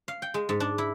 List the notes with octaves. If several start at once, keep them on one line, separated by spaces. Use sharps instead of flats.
F5
G5
G#3
G#2
D4
E4